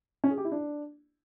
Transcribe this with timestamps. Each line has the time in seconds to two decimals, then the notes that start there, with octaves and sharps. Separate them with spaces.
0.24 C#4
0.31 G#4
0.38 G4
0.45 E4
0.52 D4